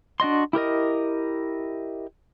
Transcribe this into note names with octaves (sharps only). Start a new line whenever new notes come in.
D4 F#4 D#5 C6
E4 G4 A#4 D#5